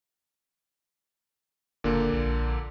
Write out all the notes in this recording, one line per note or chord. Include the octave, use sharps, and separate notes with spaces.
F#1 A#2 D3 A#3
A#1